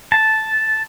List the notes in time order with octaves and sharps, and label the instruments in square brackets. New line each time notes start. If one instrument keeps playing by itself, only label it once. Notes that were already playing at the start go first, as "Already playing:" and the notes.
[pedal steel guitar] A5